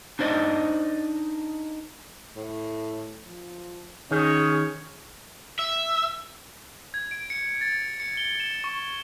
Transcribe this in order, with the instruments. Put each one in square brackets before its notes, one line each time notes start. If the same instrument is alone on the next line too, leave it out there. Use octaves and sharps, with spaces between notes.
[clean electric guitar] D4 D#4 C5 D5 D#5
[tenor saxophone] A2
F3
[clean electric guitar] D#3 [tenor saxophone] C#4 [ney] G#4 [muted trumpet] C#5
[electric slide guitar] E5
[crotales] G#6
D7
C#7
A6
C#7
G7
E7
C#6